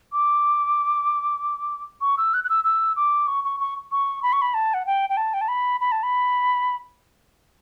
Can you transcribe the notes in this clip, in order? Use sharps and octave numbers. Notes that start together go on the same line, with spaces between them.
D6
C#6
E6
F#6
F#6
E6
E6
D6
C#6
C#6
C#6
C#6
B5
C#6
B5
A5
F#5
G5
G5
A5
G5
A5
B5
B5
A5
B5